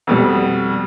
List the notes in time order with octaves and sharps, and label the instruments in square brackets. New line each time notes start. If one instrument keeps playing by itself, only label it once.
[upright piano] F2 B2 G3